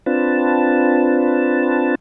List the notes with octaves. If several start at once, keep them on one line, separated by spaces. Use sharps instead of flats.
C4 D4 F4 B4 A5